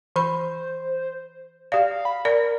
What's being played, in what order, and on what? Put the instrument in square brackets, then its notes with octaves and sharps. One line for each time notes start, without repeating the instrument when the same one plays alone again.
[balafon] E3 B5 [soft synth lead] C5
[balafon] G4 D5 [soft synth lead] F5
[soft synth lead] B5
[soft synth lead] A#4 [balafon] D5